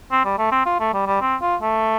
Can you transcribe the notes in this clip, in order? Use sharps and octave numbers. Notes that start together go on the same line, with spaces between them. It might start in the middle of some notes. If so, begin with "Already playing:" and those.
C4
G3
A3
C4
F4
A3
G3
G3
C4
F4
A3